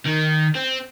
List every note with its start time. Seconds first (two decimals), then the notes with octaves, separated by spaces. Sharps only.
0.06 D#3
0.55 C4